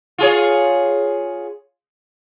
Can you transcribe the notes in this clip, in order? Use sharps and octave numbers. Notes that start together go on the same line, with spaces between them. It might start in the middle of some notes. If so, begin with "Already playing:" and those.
F4 G#4 C#5